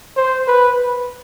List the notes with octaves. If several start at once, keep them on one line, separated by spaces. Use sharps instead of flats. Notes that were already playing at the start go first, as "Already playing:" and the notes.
C5
B4